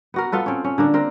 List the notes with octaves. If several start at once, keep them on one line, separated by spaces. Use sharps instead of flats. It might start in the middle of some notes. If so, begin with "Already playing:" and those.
B3 F#4 A#4
B3 F4 A4 B4
C4 C#4
C#4
D3 A#3 D4
C4 A#4